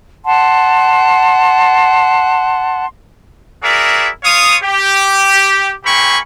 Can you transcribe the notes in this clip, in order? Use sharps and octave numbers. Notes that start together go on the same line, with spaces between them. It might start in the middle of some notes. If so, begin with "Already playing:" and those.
F#5 A5 C6
E4 F#4 G#4 A#4 D5 E5
F4 C#5 F5 D#6
G4
A#3 C4 G4 G#5 B5 C#6